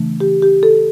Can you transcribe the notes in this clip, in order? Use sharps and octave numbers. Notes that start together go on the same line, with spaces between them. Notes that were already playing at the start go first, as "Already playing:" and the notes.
Already playing: C#3 E3 A3 D4
G4
G4
A4